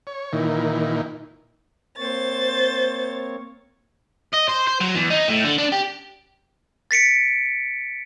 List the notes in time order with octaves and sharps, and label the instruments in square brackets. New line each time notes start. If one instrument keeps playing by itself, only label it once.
[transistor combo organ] C#5
A#2 D#3 E3
[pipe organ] A#3 C4 C#5 [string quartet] C5 A6
[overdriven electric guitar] D#5
C5
C5
F#3
E2
D#4
A2
D3
D4
G4
[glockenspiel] A6 B6 C#7 D7